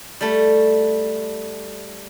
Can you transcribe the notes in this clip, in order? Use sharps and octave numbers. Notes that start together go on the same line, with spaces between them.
G3 A3